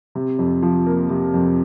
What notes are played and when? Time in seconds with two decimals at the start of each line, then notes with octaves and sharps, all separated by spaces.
0.15 C3
0.39 F2
0.62 F3
0.86 A#3
1.09 C3
1.34 F2